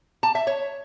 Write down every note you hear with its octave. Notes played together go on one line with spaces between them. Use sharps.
A5
E5
C#5